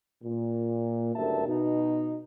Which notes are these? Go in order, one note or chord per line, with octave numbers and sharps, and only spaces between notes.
A#2
F#1 D2 G2 A#4 E5 A5
B2 D#4